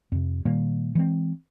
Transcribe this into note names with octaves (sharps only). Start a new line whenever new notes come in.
F2 C3
A#2 D#3 G3 A#3
E3 G#3 C4